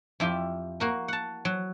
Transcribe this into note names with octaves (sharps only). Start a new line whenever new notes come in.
F2 E4 F4 G4
A#3 F#4 A#4
F#5 A5
F#3